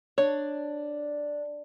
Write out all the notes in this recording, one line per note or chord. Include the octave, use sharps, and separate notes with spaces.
D4 C#5